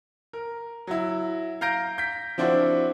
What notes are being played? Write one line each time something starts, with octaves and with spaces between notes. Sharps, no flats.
A#4
F#3 E4
F5 A#5 G6 A#6 D7
G6 B6
F3 C4 D4 E4 F#4 C5